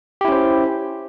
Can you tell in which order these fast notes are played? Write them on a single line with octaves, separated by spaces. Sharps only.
G4 E4 C#4 C5